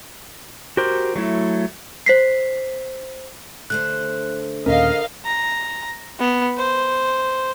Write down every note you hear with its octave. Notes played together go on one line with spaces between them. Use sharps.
F#4 G4 A#4 C5
F#3 A3 E4
C5 B6 C7
D3 A3 C5 F#6
D#2 A#2 C#4 A#4 D#5 F5
A#5
B3
C5